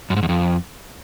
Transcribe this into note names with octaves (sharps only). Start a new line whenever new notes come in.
F#2
G#2
E2
F2